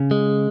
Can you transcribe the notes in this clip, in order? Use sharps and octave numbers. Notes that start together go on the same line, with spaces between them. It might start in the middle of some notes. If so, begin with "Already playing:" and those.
Already playing: C#3
G#3